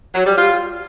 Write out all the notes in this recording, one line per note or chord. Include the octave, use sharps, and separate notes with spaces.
F#3
G3
F4